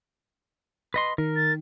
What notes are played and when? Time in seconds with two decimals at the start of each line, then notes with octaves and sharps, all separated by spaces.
0.94 B4 D#5 C6
1.18 D#3 A#4
1.36 A6